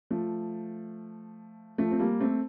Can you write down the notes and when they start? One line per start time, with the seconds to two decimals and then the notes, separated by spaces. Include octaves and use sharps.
0.11 F3 A3
1.78 F3 A3
1.91 C4
1.99 G3 A#3
2.20 A3 C4